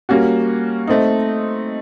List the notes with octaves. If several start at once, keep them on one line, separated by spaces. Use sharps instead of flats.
G3 A#3 C#4 F#4
A3 C4 D#4